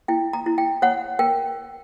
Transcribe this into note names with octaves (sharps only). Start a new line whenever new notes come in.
E4 G5
A#5
E4
G5
C#5 F#5
A#4 G5